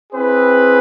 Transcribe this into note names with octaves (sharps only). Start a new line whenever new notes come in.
C4 E4 G#4 B4